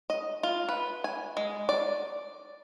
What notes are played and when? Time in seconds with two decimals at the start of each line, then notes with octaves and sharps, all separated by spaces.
0.10 D#5
0.43 F4
0.69 B4
1.04 G#5
1.37 G#3
1.69 D5